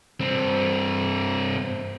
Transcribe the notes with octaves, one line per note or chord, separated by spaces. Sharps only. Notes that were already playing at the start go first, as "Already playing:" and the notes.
G2 C4